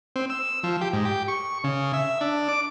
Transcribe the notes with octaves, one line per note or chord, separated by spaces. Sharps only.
C4
E6
F3
G4
G#2
G4
C#6
C#3
E5
D4
D6